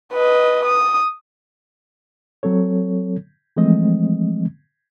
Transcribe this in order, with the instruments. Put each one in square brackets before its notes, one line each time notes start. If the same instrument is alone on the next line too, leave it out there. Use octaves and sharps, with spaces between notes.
[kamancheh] B4 D#5
D#6
[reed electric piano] F#3 C4 A4 C#5
E3 F3 G#3 A3 C4 D#5